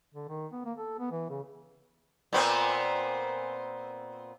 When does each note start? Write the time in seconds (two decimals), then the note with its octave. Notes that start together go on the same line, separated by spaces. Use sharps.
0.14 D3
0.29 D#3
0.52 B3
0.65 A#3
0.78 A4
0.99 B3
1.11 E3
1.30 C#3
2.33 A#2 B3 C4